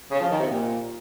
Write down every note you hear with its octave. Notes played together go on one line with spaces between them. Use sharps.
C#3
F3
D#3
C3
A#2